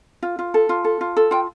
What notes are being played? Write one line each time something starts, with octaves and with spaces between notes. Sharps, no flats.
F4
F4
A4
F4
A4
F4
A4
F4 G5